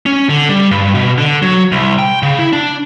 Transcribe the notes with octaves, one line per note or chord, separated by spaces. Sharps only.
C#4
D3
G3
G2
B2
D3
F#3
C2
G5
C#3
E4
D4